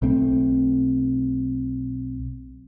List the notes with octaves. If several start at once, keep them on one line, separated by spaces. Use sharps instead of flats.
B1 A3 C4